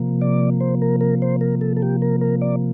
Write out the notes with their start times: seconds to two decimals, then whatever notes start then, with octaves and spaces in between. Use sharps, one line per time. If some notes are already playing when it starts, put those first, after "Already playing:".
Already playing: C3 F3 A#3
0.21 D5
0.60 C5
0.82 A#4
1.01 A#4
1.22 C5
1.41 A#4
1.61 A4
1.77 A4
1.82 G4
2.02 A#4
2.21 A#4
2.42 D5